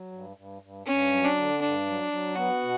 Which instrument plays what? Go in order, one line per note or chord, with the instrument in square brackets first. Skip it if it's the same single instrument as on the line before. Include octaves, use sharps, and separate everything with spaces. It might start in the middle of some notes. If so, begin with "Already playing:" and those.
Already playing: [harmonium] F#3
G2
G2
G2
[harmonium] G2 [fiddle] C#4
[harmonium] F#3
[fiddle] D4
[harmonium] D3
[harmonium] G2 [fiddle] D4
[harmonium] F#3
F#3
[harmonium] B3 [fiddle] F#4
[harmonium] B2